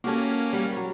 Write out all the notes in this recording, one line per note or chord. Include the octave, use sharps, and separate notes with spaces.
A#3 C#4 F#4 G4 A4
G3 F#5
F#3 C#5